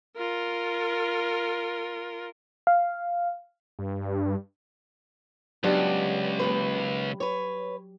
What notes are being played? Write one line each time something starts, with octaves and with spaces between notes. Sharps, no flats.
F4 A#4
F5
G2
C#2 F#3 B3 D4 G4 F#5
D#2 A#2 B4
B4 C#5